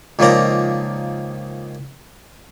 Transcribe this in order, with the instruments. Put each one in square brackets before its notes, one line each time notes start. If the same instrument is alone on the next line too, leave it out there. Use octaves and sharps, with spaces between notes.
[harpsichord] C#2 D#3 F3 A#3 D5 A#5